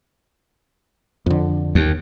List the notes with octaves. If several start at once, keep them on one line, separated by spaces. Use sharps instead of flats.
F2 D3
D#2